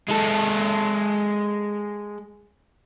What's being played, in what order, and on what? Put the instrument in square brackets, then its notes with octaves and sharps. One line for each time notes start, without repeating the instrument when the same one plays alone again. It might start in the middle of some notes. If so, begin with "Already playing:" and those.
[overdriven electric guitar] G#3 A4